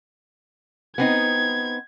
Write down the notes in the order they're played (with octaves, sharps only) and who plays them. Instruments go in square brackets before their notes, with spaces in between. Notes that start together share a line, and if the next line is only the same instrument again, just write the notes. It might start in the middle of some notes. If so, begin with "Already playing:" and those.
[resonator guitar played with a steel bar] B3 C4 D#4 [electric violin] G#6